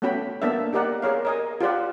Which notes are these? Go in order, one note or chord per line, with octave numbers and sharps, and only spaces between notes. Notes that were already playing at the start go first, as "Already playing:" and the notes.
A3 B3 C#4 F#4 G5 B5
A#3 B3 D4 A4 E5
D#4 G4 A#4 D5 F#5
G#4 A#4 C#5 F5
A#4 D#5 G#5
F4 G4 C5 D5 F#5